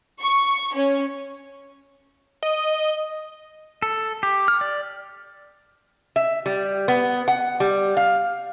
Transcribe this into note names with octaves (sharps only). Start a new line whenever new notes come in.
C#6
C#4
D#5
A4
G4
F6
D5
E5
G3
B3
F#5
G3
F5